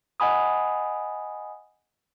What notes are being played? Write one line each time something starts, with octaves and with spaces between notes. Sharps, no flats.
D#5 F#5 G#5 B5 D#6